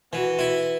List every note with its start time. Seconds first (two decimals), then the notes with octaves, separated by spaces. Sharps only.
0.13 E3 F#4
0.39 E4